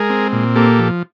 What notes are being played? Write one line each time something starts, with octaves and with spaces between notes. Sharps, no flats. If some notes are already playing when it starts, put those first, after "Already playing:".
Already playing: G#3 G#4 A#4
C4
A#2
A#3 G4 A4
F3